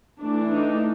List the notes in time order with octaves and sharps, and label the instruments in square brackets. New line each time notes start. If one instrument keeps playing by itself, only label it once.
[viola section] E3 A3 D4
D#4